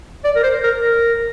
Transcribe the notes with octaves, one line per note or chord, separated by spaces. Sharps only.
D5
A#4
C5
A#4
A#4